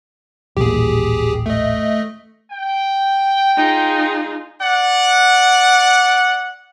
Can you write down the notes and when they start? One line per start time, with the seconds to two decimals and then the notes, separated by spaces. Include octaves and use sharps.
0.57 D#1 A1 A#2 G4 G#4
1.46 A3 D#5
2.51 G5
3.56 D#4 F4 G#4
4.62 D5 F#5